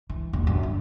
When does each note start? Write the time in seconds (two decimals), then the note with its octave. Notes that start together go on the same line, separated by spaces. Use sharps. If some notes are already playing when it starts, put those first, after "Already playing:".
0.10 E3
0.33 D#1
0.47 F#2
0.63 G2